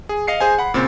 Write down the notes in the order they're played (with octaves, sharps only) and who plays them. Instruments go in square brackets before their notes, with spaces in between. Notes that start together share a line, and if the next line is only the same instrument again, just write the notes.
[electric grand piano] G#4
D#5 F5 C7 C#7
G#4 C5 G#5
F#5 B5
A#2 C#3 C4